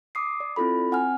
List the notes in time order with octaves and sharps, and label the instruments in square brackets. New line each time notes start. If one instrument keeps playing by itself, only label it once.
[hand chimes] D6 D#6 C7
D5
C4 E4 F4 A4 B5
C4 F#5 G#5 F6